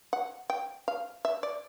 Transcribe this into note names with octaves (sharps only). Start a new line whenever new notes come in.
F#5
G5
F5
E5
D5